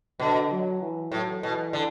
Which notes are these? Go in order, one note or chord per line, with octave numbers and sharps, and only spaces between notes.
B2 D3
F#3
E3
A2 F#3
B2 E3
D3